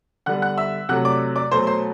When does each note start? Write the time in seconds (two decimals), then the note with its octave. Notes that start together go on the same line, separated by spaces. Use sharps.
0.26 D3 G3 B3 F#5 F#6
0.42 F#5 F#6
0.58 E5 E6
0.89 C3 F#3 A3 F#5 F#6
1.05 D5 D6
1.36 D5 D6
1.51 B2 F#3 A3 C5 C6
1.67 C5 C6